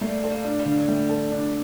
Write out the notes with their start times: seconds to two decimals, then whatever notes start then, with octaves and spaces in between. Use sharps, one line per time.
0.01 G3 A3 A#3
0.24 C4 A4
0.30 G3 A#3
0.44 D4
0.59 G3 A#3
0.66 D3
0.78 F#3
0.88 G3 A3
1.09 A4
1.32 D4